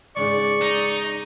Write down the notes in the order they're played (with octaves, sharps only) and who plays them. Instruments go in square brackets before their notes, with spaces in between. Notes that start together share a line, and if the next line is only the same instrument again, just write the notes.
[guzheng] G#2 C#3 G#3 [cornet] D5 [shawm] C#6
[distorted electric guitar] D#4